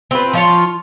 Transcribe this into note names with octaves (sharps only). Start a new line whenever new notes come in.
C4 F4 B4
F3 F4 C#5